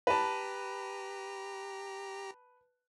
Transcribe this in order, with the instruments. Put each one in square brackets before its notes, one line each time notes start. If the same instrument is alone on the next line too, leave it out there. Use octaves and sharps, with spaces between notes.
[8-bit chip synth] G4 A#5 [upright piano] B4 A5